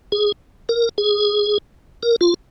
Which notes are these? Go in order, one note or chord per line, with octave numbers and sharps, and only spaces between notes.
G#4
A#4
G#4
A#4
F4